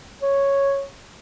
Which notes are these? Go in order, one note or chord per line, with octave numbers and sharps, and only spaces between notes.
C#5